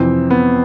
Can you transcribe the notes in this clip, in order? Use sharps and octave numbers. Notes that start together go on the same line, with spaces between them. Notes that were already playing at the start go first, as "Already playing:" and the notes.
Already playing: F2 C3 E3 C4
B3